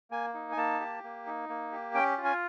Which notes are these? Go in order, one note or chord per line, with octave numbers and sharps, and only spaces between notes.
A#3 G#5
D#4
G#5
A#3 A5
G4
A#3
D#4
A#3
G4
C#4 G5
F4
G#5